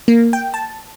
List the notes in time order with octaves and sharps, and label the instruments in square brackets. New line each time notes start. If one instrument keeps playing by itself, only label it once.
[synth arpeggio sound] A#3
G5
A5